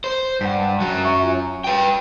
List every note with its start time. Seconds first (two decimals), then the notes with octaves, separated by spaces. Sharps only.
0.04 C5
0.41 G2 F#5 B6
0.80 F#2 F#3
1.04 E5 C#6 C#7
1.23 F4
1.64 B4 G5